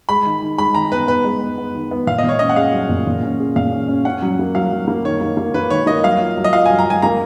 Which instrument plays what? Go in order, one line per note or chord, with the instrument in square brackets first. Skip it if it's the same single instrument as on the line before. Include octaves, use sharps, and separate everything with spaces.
[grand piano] G#3 [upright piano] B5
[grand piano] D#3
D#3
[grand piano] G#3 [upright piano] B5
[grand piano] D#3 [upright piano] A#5
[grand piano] B3 [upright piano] B4
[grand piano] B3 [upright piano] B4
[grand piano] G#3
B3
B3
D#3
B3
[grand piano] A#2 [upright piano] F5
[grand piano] A#2 [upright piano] D#5
[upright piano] C#5
[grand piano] C#4 [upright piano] D#5
[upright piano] F#5
[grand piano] G#4 [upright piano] F5
[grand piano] F#3
A#2
A#2
C#4
G#4
[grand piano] A#2 [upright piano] F5
[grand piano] C#4
C#4
[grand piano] C#4 [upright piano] F#5
[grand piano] F#3
A#3
[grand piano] F#3 [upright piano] F5
[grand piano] F#3
A#3
[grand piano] D#3 [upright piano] C#5
[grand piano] A#3
A#3
[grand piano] A#3 [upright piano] B4
[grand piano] D#3 [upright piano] C#5
[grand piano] A#3 [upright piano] D#5
[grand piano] F#3 [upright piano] F5
[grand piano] F4
F#3
[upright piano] D#5
[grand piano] F4 [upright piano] F5
[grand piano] F#3 [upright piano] G#5
[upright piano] A#5
[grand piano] F#3 [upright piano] G#5
[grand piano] A#3 [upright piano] A#5